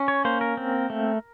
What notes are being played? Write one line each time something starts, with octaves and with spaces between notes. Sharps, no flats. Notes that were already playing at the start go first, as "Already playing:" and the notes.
Already playing: C#4
C#5
A#3 C5
A#4
C4
A3